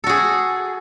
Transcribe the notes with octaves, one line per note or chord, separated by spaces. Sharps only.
F#4 G#4 A4